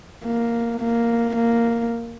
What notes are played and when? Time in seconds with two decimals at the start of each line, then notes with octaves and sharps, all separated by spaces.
0.24 A#3
0.80 A#3
1.36 A#3